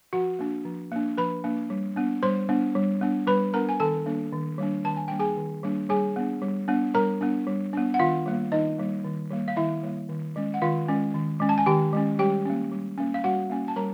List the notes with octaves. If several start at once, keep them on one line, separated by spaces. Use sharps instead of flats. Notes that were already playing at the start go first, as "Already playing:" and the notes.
F3 F#4 F#5
A#3 D4
F3
A#3 D4
F3 B4 B5
A#3 D4
G3
B3 D4
G3 C5 C6
B3 D4
G3
B3 D4
G3 B4 B5
B3 D4 A#4 A#5
G#5
D#3 A4 A5
G3 A#3 D4
D#3
G3 A#3 D4
D#3 A5
G#5
G3 A#3 D4 G5
G#4 G#5
D#3
G3 A#3 D4
G3 G#4 G#5
B3 D4
G3
B3 D4
G3 A#4 A#5
B3 D4
G3
B3 D4
F#5
D#3 F4 F5
G3 A#3
D#3 D#4 D#5
G3 A#3
D#3
G3 A#3
F5
D#3 E4 E5
G3 A#3
D#3
G#3 C#4
F#5
D#3 F4 F5
G#3 C#4
D#3
G#3 C#4
A5
G#5
D#3 G4 G5
G#3 C#4
G3 G4 G5
A#3 C#4
G3
A#3 C#4
F5
G3 F#4 F#5
A#3 C#4
A5
G3 A#4 A#5